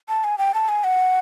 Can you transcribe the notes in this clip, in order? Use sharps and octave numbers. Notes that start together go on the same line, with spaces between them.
A5
G#5
G5
A5
G#5
F#5